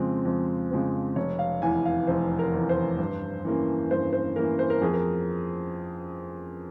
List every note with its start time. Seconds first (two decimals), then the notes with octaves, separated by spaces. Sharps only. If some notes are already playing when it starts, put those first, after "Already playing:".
Already playing: F2 C#3 F3 G#3 C4
0.25 F2
0.71 C#3 F3 G#3 C4
1.16 F1 C#5
1.39 F5
1.62 E2 E3 G#5
1.85 F5
2.07 F1 C5
2.39 A#4
2.54 E2 E3
2.69 C5
2.99 G2
3.45 E3 A#3 C#4
3.91 G2 C5
4.13 C5
4.36 E3 A#3 C#4 A#4
4.59 C5
4.70 A#4
4.82 F2 G#4
4.94 A#4